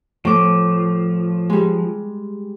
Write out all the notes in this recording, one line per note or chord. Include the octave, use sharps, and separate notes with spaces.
A2 F3 D6
G3 G#3